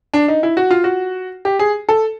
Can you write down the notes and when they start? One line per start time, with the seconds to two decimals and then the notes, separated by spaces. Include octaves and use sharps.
0.14 D4
0.28 D#4
0.43 E4
0.57 F#4
0.71 F4
0.84 F#4
1.45 G4
1.59 G#4
1.89 A4